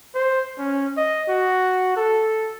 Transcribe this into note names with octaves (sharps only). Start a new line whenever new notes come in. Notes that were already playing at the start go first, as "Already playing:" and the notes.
C5
C#4
D#5
F#4
A4